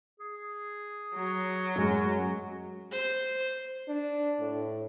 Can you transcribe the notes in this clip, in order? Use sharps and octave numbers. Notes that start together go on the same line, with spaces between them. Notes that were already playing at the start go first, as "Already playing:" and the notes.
G#4
F#3
F#2 G#3
C5
D4
A2